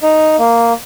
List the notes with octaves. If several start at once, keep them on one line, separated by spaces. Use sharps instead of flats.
D#4
A#3